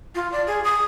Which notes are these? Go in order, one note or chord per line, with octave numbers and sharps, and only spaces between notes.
F4
D5
G#4
D#6